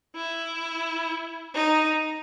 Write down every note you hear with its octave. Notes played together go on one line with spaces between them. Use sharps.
E4
D#4